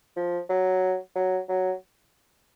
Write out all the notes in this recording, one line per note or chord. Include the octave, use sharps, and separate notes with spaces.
F3
F#3
F#3
F#3